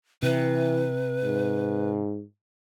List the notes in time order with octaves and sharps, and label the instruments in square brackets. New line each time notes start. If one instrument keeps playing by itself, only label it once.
[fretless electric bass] C3 [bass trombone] E3 [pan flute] B4
[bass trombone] G#2